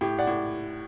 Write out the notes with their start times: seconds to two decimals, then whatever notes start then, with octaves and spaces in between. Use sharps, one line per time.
0.01 A2 G4
0.18 D5 F#5
0.27 A2